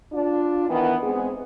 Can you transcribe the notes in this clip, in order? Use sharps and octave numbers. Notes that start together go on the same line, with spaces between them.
D4 F4
D#3 E3 B3
G#3 B3 C4 G#4